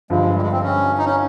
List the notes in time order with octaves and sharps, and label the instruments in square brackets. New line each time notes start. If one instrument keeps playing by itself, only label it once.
[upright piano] G1 G2 F3 [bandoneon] G#3
[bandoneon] G3
G#3
C4
C#4
D#4
C#4